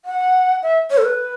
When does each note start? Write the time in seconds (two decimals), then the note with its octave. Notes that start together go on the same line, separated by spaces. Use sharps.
0.05 F#5
0.63 E5
0.91 C#5
0.98 A4
1.05 B4